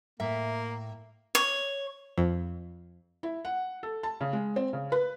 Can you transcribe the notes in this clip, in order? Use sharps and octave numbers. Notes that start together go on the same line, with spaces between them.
A2 A#3 E5
C#5
F2
E4
F#5
A4
A5
C#3
G#3
C4
C#3
B4